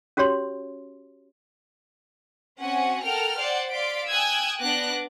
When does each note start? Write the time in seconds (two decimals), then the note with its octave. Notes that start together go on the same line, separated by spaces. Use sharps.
0.17 C#4 F#4 G4 C#5 C6
2.61 C4 C#4 F#4 F#5 G#5
3.04 A4 A#4 F#5 G5 F6
3.38 C5 D5 F#5
3.69 D5 F5 C6 B6 D7
4.10 G5 G#5 D#6 E6 F#6 G#6
4.61 B3 D4 D6 F#6 A#6